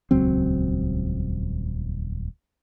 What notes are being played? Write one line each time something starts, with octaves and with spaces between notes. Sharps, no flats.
D#1 C#2 F#3 C4